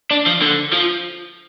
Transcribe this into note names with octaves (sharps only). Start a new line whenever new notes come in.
D4
F3
D3
F3